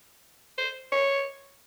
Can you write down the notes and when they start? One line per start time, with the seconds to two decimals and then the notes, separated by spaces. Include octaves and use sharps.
0.58 C5
0.92 C#5